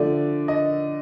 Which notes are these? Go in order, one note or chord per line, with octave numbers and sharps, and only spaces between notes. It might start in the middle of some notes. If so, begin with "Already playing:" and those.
Already playing: D3 F3 A3 D5
D#5